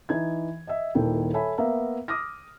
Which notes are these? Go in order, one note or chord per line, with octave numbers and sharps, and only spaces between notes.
E3 D#4 G#6
D#5 E5
D#1 A#2 D#3 E4 A4 G5
A4 C#5 E5 G#5 B5
A#3 B3 E5 F5 A#5
D6 D#6 F6 A#6